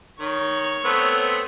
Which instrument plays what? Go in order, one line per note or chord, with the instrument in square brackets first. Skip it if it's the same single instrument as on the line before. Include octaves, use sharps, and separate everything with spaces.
[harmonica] D#3 [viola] C#5
[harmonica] A3 B3 C4